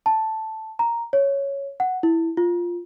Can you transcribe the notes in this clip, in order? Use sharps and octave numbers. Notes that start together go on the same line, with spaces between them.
A5
A#5
C#5
F#5
E4
F4